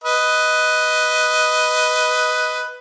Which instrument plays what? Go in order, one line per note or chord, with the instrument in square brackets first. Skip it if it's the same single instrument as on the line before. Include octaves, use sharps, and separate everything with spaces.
[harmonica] B4 D#5